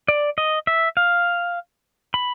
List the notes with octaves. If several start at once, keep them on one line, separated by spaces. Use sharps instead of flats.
D5
D#5
E5
F5
B5